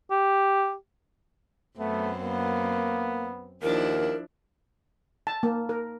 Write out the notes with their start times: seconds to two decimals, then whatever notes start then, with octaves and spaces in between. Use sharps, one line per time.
0.11 G4
1.79 F#2 A3 B3 C4
2.20 A#3 B3
3.62 D#2 F3 D4 E4 A#4
5.27 A5
5.43 A#3
5.69 A#4